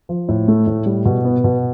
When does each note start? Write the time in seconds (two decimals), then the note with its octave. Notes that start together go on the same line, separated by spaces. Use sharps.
0.09 F3
0.29 A2
0.48 A3
0.67 A2
0.86 G3
1.05 B2
1.25 B3
1.44 B2